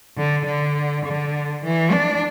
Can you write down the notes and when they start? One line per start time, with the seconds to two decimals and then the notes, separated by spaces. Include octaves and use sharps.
0.17 D3
0.46 D3
1.05 D3
1.64 E3
1.92 D4